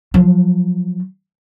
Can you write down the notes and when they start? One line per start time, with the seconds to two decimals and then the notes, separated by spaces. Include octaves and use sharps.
0.14 F3 F#3